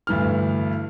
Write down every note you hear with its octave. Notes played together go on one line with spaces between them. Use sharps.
D2 G2 E3 F6